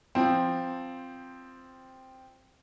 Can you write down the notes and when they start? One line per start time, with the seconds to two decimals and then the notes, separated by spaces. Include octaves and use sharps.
0.15 F3 C4